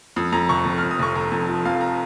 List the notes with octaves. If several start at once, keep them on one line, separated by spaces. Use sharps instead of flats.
F2 D#6
F2 A#5
F1 C#6
F1
F6
F2
D#6
F1 C#6
F1 A#5
F2
F3
F2 F5
A#5